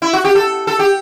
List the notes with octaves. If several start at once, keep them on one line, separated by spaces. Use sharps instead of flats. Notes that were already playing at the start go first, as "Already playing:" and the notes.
E4
F#4
G4
A4
A4
G4